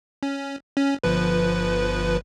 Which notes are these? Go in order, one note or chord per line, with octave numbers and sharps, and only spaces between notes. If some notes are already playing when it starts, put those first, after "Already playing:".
C#4
C#4
G1 F3 B4